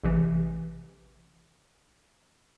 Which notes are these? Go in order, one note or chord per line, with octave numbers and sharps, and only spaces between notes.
A1 C3 E3